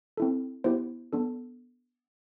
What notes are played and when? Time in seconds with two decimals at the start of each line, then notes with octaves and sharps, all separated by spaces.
0.17 C4 E4 A4
0.64 B3 E4 G4 C5
1.13 B3 D4 A4